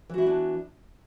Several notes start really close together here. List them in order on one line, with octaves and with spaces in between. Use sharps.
E3 F#4 E4 B3 D4